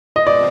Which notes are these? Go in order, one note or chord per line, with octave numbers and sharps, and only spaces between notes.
C3 F3 C4 D#5
D5